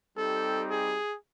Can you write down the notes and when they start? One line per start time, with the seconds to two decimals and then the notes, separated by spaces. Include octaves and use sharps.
0.16 G3 C4 D#4 G4 A4
0.68 G#4